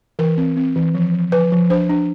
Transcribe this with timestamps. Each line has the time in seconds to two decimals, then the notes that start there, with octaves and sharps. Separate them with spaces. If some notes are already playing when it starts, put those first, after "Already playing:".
0.19 E3 A#4
0.37 C4
0.57 C4
0.76 E3
0.95 F3
1.13 F3
1.32 F3 B4
1.52 F3
1.70 D4 C5
1.90 D4